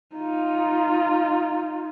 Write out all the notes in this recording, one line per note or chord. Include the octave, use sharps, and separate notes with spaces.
D#4 F4